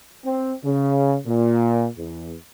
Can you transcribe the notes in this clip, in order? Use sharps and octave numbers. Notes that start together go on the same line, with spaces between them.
C4
C#3
A#2
E2